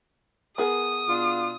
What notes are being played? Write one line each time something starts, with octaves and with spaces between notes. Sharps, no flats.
B3 G#4 A#4 D#6
B2 D4 F4